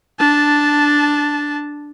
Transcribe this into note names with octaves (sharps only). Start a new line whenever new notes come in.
D4 A5